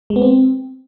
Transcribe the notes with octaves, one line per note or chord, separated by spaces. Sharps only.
G#3
B3
C4